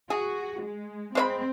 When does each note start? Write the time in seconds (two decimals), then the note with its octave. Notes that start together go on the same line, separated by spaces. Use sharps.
0.10 F#4 G#4
0.62 G#3
1.15 G#3 C4 C#5 B5